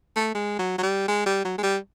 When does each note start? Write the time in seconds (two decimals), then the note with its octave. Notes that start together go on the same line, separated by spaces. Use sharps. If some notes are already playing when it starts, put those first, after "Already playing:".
0.16 A3
0.34 G#3
0.59 F#3
0.78 F#3
0.83 G3
1.08 G#3
1.26 G3
1.44 F#3
1.58 G#3
1.63 G3